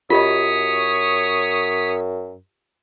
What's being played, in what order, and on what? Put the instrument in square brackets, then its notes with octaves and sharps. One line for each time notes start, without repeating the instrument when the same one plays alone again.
[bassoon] F#2 [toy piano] F4 G4 D#5 [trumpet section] C#5 D#6 [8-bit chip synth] B6